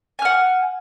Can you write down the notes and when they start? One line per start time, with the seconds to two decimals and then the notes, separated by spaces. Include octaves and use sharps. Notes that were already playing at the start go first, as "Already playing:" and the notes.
0.19 G#5
0.22 F6
0.25 F#5